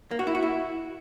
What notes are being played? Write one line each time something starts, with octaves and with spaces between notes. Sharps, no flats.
A#3
F#4
E4
F#4
E4